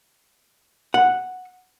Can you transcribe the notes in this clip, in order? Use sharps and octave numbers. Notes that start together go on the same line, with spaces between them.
F#5